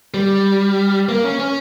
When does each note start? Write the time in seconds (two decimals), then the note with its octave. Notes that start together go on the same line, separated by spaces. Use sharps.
0.14 G3
1.09 A#3
1.24 C#4
1.39 C#4